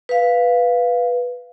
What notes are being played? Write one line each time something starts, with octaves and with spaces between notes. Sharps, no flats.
B4 F5